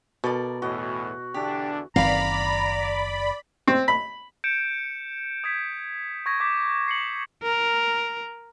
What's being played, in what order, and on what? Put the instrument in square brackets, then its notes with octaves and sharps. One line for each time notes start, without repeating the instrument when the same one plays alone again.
[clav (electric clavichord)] B2 [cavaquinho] A4 A#4 D5
[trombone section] E2 A2 [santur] F#4 [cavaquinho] D#5
[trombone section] E2 D3 D4 [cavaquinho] G4
[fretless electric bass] F#1 D#3 C4 [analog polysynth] D5 B5 [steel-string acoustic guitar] F5 [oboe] A#5
[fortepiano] C4
B5
[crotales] G6 C#7 D7 E7
D#6 G6 G#6 B6
C#6 G#6 A#6
D6 G6 B6
C7 C#7 F#7
[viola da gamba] A#4